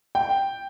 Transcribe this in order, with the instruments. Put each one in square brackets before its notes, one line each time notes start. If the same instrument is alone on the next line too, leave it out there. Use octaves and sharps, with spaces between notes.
[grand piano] G5